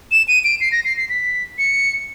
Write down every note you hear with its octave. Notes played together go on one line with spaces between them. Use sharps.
E7
D#7
D7
C7
A#6
C7
C7
B6
C#7